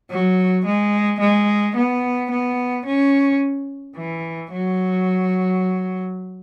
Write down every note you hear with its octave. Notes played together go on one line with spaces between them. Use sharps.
F#3
G#3
G#3
B3
B3
C#4
E3
F#3